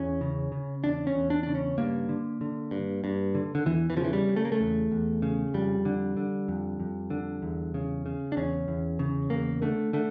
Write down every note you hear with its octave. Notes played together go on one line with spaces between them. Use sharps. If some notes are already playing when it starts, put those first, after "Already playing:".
Already playing: E2 C#4
C#3
C#3
E2 D4
C#4
E2
D4
C#3 D4
C#4
G2 A#3
D3
D3
G2
G2
D3
D3
E2 E3
E3
C#3 F3
E3
G3
C#3
A3
A#3
A3
E2
E2
C#3
F2 G3
D3
D3
F2
F2
D3
E2
C#3
C#3
D4
E2 C#4
E2
C#3
E2 A#3
D3 A3
D3 A3